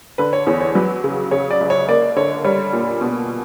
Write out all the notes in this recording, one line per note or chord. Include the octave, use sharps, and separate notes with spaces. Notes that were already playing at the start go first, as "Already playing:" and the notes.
D3 B4
C#5
E2 C#5
C#5
F#3 B4
C#3
C#3 C#5
D5
C#2
C#5
A#3 D5
D3 C#5
G3 C#5
A#2
B2